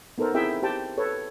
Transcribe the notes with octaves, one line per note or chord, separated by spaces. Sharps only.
B3 D#4 A4 A#4 C5
C4 E4 G#4 E5 G5
G4 C5 G5 A5
A4 B4 C#5